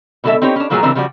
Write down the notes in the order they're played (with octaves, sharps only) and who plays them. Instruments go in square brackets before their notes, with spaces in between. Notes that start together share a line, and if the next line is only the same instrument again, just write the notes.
[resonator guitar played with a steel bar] B2 D3 G3 G#3 A4 E5
C4 D#4 G4 B4 C#5
C#4 D4
A#2 F3 F#3 A3 A#3 G#4
C#3 E3 G3 C4 D4 A#4
C#3 F3 G3 F#4 D5